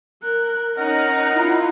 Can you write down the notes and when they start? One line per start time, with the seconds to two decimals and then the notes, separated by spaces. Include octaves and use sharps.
0.23 A#4 F#6
0.77 C#4 D#4 A#4 F#5
1.33 E4 F4